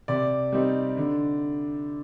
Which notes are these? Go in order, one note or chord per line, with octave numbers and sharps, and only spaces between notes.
C3 D5
G3 C4 D#4
D3